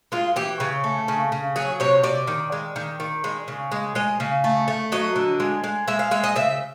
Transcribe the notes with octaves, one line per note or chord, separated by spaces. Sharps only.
G#3 F4
E3 G4
C#3
A3
C#3
C#3
F#3 G#4
C3 C#5
C3 D5
D#3
G#3
D#3
D#3
G#3
C#3
G#3
G#3 D#5
C#3
A3
A3
F#3 D#5
D3
G#3
G#3
G#3 E5
F5
G#3 E5
D#5
C#3 E5